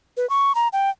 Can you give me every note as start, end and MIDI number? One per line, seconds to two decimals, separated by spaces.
0.17 0.28 71
0.30 0.55 85
0.55 0.68 82
0.73 0.90 79